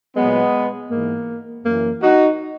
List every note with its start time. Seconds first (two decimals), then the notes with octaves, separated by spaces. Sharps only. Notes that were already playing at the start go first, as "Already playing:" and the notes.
0.16 A#2 F#3 G#3 B3
0.90 G#2 E3 A#3
1.65 F#2 E3 A#3
2.02 D#4 F#4